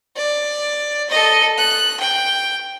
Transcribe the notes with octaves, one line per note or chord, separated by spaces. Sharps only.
D5
A4 D#5
F#6
G5